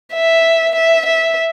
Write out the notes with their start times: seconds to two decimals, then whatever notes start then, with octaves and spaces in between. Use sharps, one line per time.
0.14 E5
0.75 E5
1.06 E5